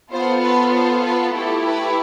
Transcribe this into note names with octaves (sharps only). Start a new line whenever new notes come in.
B3 F4 A4 C5
B4
C5
B4
A3 E4 G4 A4
B4